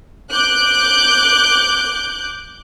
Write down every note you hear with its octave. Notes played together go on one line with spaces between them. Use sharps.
D6 F#6 G6